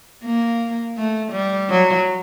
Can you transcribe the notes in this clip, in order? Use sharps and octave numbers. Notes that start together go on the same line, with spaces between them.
A#3
A3
G3
F#3